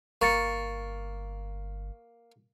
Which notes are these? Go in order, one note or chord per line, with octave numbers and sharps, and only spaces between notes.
G1 A#3 C#6 A6 C#7